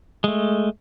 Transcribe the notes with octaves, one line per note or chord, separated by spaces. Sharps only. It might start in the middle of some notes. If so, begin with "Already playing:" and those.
G#3 A3